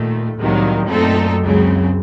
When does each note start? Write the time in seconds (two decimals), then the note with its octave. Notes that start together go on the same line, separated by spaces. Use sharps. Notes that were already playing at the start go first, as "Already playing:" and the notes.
Already playing: D#2 A#2 D#3 A3
0.39 C2 A2 C3 D#3 F#3 A#3
0.90 F#2 A#2 A3 C4 D#4 A4
1.42 C#2 C#3 F#3 C4